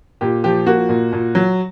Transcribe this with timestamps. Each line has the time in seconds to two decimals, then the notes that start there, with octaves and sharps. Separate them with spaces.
0.21 A#2 G4
0.44 F3 G4
0.66 A#3 F#4
0.89 A#2
1.13 A#2
1.35 F#3